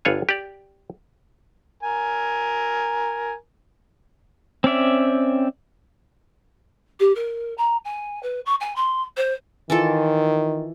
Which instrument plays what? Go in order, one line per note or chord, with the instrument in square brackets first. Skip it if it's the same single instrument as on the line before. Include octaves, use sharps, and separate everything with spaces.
[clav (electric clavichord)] G1 G2 F4 C#5 F#5 G#5
G4 D5
[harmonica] A#4 G#5
[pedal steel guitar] C4 C#4 D5 E5
[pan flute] G4
A#4
A#5
G#5
B4
C#6
G#5
C6
C5
[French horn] D#3 [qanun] E3 F4 A4